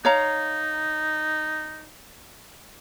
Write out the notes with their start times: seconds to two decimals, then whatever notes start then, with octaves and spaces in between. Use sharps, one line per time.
0.05 D#4 C#5 F5 A#5